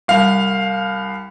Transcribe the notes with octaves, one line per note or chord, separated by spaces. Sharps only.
C2 F5